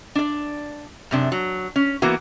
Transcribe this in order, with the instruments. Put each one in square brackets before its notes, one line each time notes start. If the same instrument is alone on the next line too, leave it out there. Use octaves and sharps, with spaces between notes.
[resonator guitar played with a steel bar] D4 D5
F#2 C3 D4
F#3
C#4
E3 A#3 B3 F#4